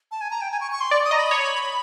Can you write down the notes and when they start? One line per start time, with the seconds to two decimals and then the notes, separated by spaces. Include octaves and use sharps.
0.11 A5
0.21 G#5
0.31 A#5
0.41 G5
0.52 G#5
0.61 C#6
0.72 C#6
0.81 C6
0.91 D5 C#6
1.05 D#6
1.11 D#5 A#5
1.18 B5
1.31 C#5